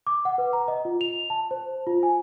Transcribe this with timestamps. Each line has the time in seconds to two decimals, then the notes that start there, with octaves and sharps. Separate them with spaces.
0.07 D6
0.25 F#5
0.38 B4
0.53 A#5
0.68 D#5
0.85 F4
1.01 F7
1.30 A5
1.51 C5
1.87 F4
2.03 G#5